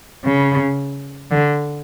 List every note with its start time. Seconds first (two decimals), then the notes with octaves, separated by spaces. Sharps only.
0.25 C#3
1.31 D3